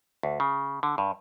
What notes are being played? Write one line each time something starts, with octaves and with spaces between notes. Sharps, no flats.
D2
C#3
D3
G2